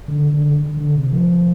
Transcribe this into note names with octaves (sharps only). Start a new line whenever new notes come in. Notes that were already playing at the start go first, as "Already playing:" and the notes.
D3
D3
D3
C3
F3